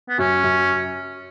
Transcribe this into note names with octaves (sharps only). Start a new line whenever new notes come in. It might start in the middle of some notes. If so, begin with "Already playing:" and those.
B3
F#2 C#4
F#2